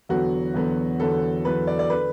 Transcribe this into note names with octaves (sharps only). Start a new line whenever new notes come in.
E2 D3 F#3 B3 F#4
E2 D3 F#3 B3
E2 D3 F#3 B3 A4
E2 D3 F#3 B3 B4
D5
D5
D3 B4